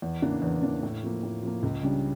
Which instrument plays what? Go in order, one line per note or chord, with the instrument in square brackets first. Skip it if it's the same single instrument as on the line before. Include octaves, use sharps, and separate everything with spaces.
[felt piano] E2
C#3 E3 A#3 D4
E2
C#3 E3 A#3 D4
A2
F3 A#3
A2
F3 A#3
C#2
C#3 G3 D4